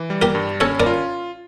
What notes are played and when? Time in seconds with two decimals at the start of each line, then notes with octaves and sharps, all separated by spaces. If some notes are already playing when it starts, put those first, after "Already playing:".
Already playing: E3
0.10 G3
0.22 G4 A#4
0.35 G2
0.60 C#4 A4 C#5
0.80 A#4 D5
0.86 F4